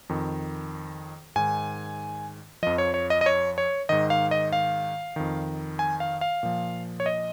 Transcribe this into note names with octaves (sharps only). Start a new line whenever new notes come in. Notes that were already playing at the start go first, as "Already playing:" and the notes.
F2 D#3
G#2 D#3 G#5
F2 F3 D#5
C#5
C#5
D#5
D#5
C#5
C#5
G#2 D#3 D#5
F5
D#5
F5
F2 D#3
G#5
F5
F5
A#2 F3
C#5
D#5